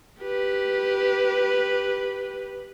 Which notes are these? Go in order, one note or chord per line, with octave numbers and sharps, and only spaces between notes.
G4 B4